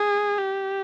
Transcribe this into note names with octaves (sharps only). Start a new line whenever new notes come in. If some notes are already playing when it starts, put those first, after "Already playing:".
Already playing: G#4
G4